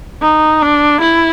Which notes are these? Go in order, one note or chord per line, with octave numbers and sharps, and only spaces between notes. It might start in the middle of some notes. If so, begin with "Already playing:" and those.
D#4
D4
E4